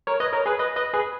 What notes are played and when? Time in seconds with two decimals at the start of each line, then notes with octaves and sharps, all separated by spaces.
0.07 A#4 C#5
0.20 B4 D#5
0.33 A#4 C#5
0.46 G#4 B4
0.59 B4 D#5
0.76 B4 D#5
0.94 G#4 B4